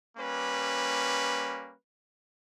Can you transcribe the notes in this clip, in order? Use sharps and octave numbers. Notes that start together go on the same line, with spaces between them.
G3 A#3 C#4 B4